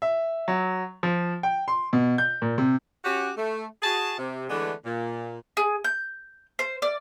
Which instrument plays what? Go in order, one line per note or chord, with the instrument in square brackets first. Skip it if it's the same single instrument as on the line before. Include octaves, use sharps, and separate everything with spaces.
[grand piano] E5
F#3
F3
G5
C6
B2
G6
A#2
C3
[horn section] C#4 F#4 G4
A3
F#4 G#4 A5
C3
D3 E3 G#3 A3 B3 D4
A#2
[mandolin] G#4
G6
C5
D5